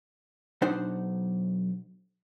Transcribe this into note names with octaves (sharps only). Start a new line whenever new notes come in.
B1 D4 D#4 C5 F#5